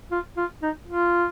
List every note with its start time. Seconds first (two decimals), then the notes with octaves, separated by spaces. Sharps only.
0.11 F4
0.37 F4
0.62 D#4
0.88 F4